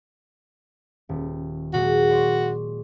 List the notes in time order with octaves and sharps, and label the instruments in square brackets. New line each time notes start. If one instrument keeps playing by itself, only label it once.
[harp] D#1
[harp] A#2 F#3 G#3 [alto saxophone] F#4
[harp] D5 C6 C#6